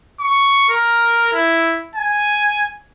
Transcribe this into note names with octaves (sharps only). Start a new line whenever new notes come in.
C#6
A#4
E4
G#5